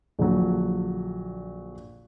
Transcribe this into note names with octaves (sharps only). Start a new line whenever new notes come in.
A#1 D3 F#3